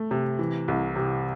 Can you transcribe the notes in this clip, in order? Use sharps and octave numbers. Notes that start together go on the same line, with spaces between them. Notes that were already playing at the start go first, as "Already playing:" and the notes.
Already playing: A3
C3
E3
C2
C3